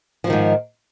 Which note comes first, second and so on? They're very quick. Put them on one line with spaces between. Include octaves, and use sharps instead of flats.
F3 B2 D#3 G#2